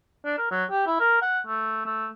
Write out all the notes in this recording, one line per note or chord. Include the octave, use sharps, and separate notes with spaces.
D4
A#4
F#3
G4
E4
A#4
F#5
A3
A3